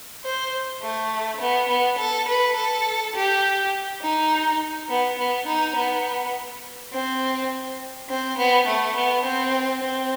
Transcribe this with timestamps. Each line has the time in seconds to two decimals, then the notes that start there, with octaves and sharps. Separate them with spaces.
0.25 C5
0.82 A3
1.41 B3
1.69 B3
1.99 A4
2.28 B4
2.57 A4
3.15 G4
4.02 D#4
4.89 B3
5.19 B3
5.47 D#4
5.76 B3
6.93 C4
8.09 C4
8.38 B3
8.67 A3
8.96 B3
9.25 C4
9.83 C4